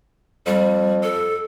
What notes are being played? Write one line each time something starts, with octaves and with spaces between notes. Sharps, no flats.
F2 G3
A4